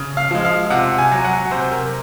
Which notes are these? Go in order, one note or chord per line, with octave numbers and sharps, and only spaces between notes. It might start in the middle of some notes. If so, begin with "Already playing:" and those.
Already playing: C#3
F5
F3 G#3
F5
C3 F#5
G#5
F#3
F#5
C3 C5
A#4